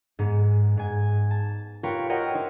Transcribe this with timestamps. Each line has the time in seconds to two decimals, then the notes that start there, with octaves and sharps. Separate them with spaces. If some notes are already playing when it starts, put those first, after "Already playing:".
0.19 G#2 G#3 B3
0.77 G#2 G#5
1.31 A5
1.83 F4 G4 A#4 B4 C#5 G5
2.09 F#4 A#4 C#5 D#5 F#5 G5
2.35 D#4 E4 C5